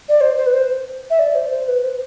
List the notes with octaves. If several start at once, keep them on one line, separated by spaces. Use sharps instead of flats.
D5
C5
C5
B4
C5
E5
D5
C5
C5
B4
C5